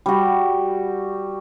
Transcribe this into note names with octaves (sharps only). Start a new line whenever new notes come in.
G3 F#4